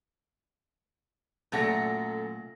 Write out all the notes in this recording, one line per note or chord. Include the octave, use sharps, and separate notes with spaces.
F#2 A#2 A3 A4 F#5 A#6